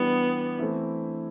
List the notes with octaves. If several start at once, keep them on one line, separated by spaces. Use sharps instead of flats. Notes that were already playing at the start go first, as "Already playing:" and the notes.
Already playing: E3 G3 B3 D4 G4
E3 A3 C4 E4